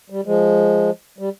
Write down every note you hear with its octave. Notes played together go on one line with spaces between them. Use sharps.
G3
F3 G#3
G3